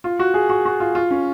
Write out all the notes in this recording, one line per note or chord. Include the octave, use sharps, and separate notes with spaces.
F4
F#4
G#4
F#4
F#4
F4
F4
C#4